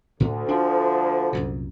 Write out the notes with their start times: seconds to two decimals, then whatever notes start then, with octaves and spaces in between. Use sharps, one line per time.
0.20 D2 A2
0.48 F3 D4
1.33 C2 F#2 A#2